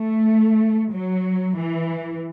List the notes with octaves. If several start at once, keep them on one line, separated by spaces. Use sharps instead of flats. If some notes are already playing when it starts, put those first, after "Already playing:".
Already playing: A3
F#3
E3